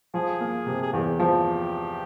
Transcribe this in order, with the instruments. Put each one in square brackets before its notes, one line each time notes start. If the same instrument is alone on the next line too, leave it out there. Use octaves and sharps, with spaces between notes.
[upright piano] F3 [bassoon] G#4
[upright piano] A#3
C3
[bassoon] G#4
[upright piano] E2 [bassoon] G4
[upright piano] F3